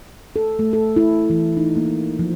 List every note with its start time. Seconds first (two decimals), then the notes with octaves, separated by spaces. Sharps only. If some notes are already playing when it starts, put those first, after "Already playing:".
0.36 A4
0.59 A3
0.73 A4
0.96 E4
1.30 E3
1.57 D#4
1.76 A#3
2.19 F3